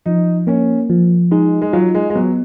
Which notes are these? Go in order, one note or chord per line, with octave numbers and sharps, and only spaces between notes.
F3 D#4
A#3 C#4
F3
G#3 D#4
G#3
F#3 F4
G#3
G#3
F#3 B3